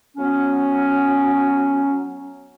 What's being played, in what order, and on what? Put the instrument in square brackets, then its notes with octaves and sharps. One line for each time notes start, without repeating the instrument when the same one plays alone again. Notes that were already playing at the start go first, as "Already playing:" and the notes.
[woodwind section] F#3 B3 C#4